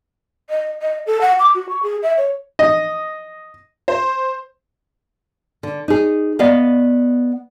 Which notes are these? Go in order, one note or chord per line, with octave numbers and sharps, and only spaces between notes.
D#5
D#5
A4
F#5
D6
F#4
C#6
G#4
E5
C#5
D#5
C5
D3
D#4 G#4
B3 D5 D#5 F5